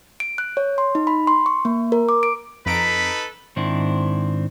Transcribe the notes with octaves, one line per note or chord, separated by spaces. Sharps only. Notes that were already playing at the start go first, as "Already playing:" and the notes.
D7
F#6
C#5
C6
D#4
B5
C6
C#6
A#3
A#4
D6
D7
F2 D#4 A4 B4 A#5 B6 D7
G#2 D#3 C4 D4 E4